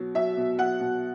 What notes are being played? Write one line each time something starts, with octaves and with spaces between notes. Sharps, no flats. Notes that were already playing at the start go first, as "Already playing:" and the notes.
Already playing: B2 F#3
F#3 E5
B2
F#3 F#5
B2